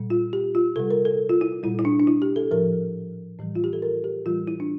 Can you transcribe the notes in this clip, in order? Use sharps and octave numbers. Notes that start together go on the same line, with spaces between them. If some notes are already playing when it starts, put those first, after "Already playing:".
Already playing: A#2 G3
F4
G4
F4
C3 G3 A4
A#4
A4
F4
E4
A#2 G3 E4
E4
D4
D4
E4
G4
A4
A2 F3 A#4
A2 E3 G3
F4
G4
A4
A#4
G4
A2 E3 G3 F4
E4
D4